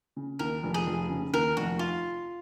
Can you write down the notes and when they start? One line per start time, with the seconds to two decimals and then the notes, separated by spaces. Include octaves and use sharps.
0.16 C#3
0.39 D#2 A#4
0.63 F1
0.74 G#4
0.86 F1
1.10 C#3
1.33 D#2 A#4
1.57 F1 F#4
1.79 F4